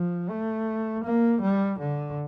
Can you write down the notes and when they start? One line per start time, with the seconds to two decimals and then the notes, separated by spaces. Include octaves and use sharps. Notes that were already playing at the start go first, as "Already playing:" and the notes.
Already playing: F3
0.29 A3
1.04 A#3
1.42 G3
1.79 D3